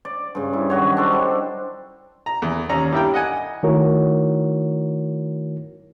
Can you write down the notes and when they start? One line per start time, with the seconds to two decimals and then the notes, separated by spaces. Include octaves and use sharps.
0.05 D5
0.35 G2 C#3
0.53 E4
0.70 D#3 F#3 F#4 C#5
0.97 D4 A4 C5
1.13 G3
2.26 A#5
2.42 E2
2.69 D#2 C#4 A#5
2.93 G3 D4 E4 A#4 G5
3.14 D#5 F#5 G#5
3.63 D#3 A3 E4 F#4 A#4 C#5